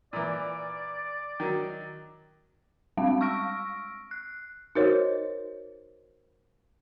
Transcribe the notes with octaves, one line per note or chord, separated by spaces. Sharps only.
A#2 E3 D5
D#3 F#3
G3 G#3 C4 F5
C#6 E6 F6 A#6 D7
F#6
D#4 F#4 A#4 C5 C#5 D#5